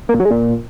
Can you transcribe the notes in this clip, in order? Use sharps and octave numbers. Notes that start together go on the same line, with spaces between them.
A#3
A#2
F#3
G#3
A#2